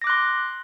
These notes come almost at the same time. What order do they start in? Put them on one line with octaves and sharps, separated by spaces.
A#6 D6 F#6 C6